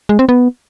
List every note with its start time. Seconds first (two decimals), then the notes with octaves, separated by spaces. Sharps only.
0.09 G#3
0.19 C4
0.29 B3